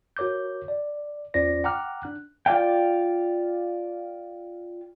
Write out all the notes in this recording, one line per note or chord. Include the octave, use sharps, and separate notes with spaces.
F#4 A#4 C#5 D6 G6
D5
E2 C#4 F4 C5 D5 A#6
F#5 G5 A#5 D6 F6 F#6
D4 F#6
F4 D5 F5 G5